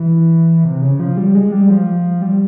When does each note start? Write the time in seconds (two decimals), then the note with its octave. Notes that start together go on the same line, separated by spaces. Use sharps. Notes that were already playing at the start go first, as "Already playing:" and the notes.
Already playing: E3
0.64 C3
0.82 C#3
1.00 F3
1.17 G3
1.35 G#3
1.52 G3
1.70 F3
2.22 G3